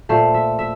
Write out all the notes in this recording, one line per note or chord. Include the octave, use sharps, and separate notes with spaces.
A#2 A3 C5
E5
E5